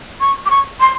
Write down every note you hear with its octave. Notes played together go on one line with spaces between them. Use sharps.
C#6
D6
C#6
C6